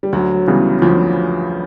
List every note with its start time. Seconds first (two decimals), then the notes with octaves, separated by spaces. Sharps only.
0.03 G3
0.13 D2 F#3
0.48 C#3 E3 G3 B3
0.82 D2 F3